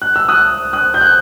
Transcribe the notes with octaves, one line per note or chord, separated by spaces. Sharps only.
F#6
E6
D#6 F#6
D#6 F#6
G6
F#6